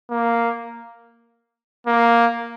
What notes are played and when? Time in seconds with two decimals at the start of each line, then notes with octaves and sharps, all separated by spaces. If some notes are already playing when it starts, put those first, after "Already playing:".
0.10 A#3
1.87 A#3